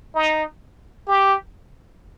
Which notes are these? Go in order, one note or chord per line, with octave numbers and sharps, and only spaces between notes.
D#4
G4